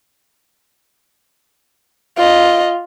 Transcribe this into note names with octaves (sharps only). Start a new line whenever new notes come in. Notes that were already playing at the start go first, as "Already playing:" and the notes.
F4 D#5